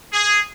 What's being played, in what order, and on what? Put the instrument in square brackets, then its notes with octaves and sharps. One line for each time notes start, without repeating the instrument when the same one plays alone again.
[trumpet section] G#4